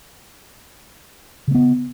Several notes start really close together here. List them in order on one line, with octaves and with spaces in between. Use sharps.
C#3 A#3 B3